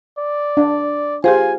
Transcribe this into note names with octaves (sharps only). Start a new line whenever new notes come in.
D5
D4
F4 G4 G#4 C5 G#5